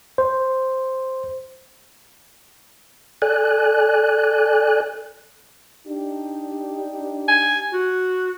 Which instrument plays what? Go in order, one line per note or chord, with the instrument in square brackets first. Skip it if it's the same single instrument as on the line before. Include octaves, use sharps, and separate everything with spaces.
[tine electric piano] C5
[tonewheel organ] A4 D5 G#5 F#6
[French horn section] D4 D#4 G4
[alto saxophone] G#5
F#4